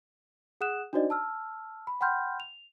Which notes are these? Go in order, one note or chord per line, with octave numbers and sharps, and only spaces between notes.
G#4 F#5 D#6 F#6 E7
D4 D#4 F#4 C5 D5 D#5
A5 E6 F6
B5
F#5 G5 B5 C6 F6 G6
F7